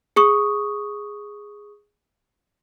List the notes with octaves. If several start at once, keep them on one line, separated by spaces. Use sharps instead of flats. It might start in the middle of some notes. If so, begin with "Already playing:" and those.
G#4 C#6 D#6